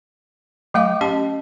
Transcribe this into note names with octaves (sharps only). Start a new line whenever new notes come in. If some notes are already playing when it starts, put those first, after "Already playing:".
F#3 A3 F5 D6
C#4 G4 D#5 A5